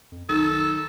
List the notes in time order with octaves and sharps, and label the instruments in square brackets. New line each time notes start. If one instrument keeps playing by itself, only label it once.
[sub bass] F2
[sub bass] B1 [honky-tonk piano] D#3 [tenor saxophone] A4